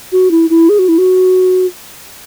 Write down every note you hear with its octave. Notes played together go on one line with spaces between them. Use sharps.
F#4
E4
E4
G#4
F#4
E4
F#4